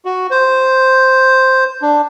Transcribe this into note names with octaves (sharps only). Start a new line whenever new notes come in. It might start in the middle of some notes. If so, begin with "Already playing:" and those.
F#4
C5
D4